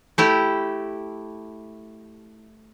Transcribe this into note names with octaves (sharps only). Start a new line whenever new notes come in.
A3 E4 G4